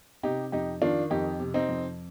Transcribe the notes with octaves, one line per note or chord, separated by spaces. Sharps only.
C3 D#4 G4
F2 D#4 G4
D#3 D4 F4
F2 D#4 G4
C3
C4 D#4
F2